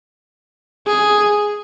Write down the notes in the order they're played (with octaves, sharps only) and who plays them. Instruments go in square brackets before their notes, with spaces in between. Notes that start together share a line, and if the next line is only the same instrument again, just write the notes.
[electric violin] G#4